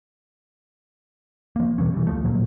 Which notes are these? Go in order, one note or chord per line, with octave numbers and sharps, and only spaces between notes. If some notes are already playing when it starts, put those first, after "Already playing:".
F3 A#3
B2 E3 G3 C#4
E3 G3
D2 F3 A3
D1 A#2 F#3 A#3